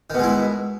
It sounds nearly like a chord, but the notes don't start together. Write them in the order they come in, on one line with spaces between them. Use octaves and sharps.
D#3 B2 G#3 E4